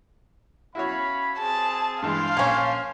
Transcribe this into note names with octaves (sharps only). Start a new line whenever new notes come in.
C#4 E4 F#4 C#5 F5 B5
C4 G#4 A5
G2 E3 G#3 F5 G5 A5 C6
A#1 A#3 C#4 C#5